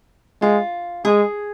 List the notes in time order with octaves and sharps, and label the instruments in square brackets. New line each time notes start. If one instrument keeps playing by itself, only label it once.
[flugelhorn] G#3 [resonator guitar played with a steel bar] F4
[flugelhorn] G#3 [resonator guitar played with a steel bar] G#4